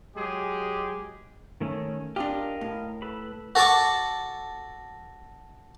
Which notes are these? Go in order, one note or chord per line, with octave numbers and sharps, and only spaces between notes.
F#3 G#3 G4 G#4
D#3 A3 C#4
D4 F4 G4 A#4 D#5 F5
A2
A4 B4 B5
F#4 A4 A5 C#6 D6